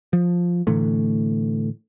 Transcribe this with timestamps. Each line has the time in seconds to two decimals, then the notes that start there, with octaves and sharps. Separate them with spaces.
0.13 F3
0.67 A2 D3 E3 A3